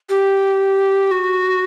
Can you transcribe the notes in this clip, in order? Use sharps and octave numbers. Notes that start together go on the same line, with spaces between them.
G4
F#4